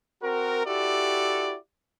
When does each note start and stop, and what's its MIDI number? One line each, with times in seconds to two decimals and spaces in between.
0.23 0.62 60
0.23 0.62 66
0.23 0.62 70
0.66 1.55 64
0.66 1.55 66
0.66 1.55 67
0.66 1.55 69
0.66 1.55 74